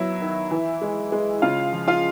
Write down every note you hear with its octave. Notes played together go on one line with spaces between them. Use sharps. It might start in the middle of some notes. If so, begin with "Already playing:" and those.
Already playing: F#3 B3 E4 E5
D#3
E3
G#3
G#3
C#3 F4 F5
F3
F4 F5